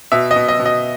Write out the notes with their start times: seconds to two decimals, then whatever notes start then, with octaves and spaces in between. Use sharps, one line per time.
0.12 B2 E5
0.31 D#5
0.36 B2
0.48 D#5
0.60 B2
0.65 D#5